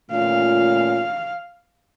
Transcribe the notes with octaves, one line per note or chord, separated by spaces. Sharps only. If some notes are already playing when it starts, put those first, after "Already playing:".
A#2 A3 C#4 F4 F5